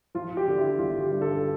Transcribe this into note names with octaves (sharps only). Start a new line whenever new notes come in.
F3 F4
G4
D3
E4
G1 F4
G4
G2
A4